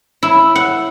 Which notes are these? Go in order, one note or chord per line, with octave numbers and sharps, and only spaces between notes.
E4
F#5